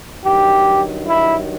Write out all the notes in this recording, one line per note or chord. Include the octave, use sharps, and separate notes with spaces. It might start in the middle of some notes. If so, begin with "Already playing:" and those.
G2 D#3 F#3 G4
E4